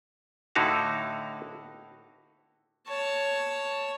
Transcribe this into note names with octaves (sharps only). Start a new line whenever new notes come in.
A2 D3 D#4 E4 F#4 F5
C#5 A5